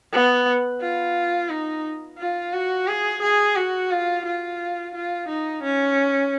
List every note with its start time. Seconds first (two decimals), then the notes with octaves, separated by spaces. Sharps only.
0.13 B3
0.81 F4
1.49 D#4
2.19 F4
2.53 F#4
2.88 G#4
3.22 G#4
3.56 F#4
3.91 F4
4.25 F4
4.94 F4
5.28 D#4
5.63 C#4